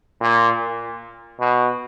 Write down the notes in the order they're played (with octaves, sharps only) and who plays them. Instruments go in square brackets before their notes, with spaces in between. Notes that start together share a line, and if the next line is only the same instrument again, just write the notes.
[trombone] A#2
B2